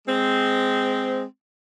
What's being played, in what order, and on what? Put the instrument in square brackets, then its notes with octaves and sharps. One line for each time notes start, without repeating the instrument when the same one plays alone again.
[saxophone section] G#3 C4